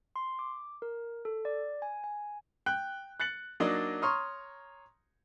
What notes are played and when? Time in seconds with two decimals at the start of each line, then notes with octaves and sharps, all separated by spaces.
0.16 C6
0.39 D6
0.82 A#4
1.25 A4
1.45 D5
1.82 G#5
2.04 G#5
2.66 G5 F#6
3.20 F#6 A6 C#7 F#7
3.60 F#3 A#3 D4 D#4 D5 D#5
4.02 C#5 A#5 C6 C#6 D#6 F6